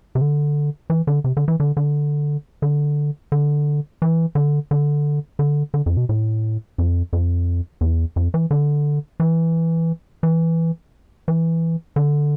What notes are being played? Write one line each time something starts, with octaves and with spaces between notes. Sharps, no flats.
C3
D3
E3
D3
C3
D3
E3
D3
D3
D3
D3
E3
D3
D3
D3
D3
F2
B2
A2
F2
F2
E2
F2
E3
D3
E3
E3
E3
D3